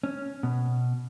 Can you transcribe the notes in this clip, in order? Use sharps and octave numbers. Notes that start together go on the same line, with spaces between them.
C#4
B2